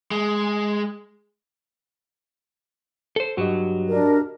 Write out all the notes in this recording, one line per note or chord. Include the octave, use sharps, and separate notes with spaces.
G#3
A4 C5
G2 F#3 F#4 G4 D#5
D4 A#4